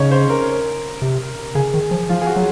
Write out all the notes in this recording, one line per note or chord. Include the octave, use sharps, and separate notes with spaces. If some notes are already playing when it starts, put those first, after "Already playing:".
Already playing: C#3 C#4 D#4 C#5
C5
A#4
C3
C#3 G#4
D#3
F3
F3 F4
G#4
F#4
F#3